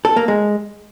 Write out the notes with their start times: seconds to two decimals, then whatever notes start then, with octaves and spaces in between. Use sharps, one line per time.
0.05 A4
0.16 A#3
0.28 G#3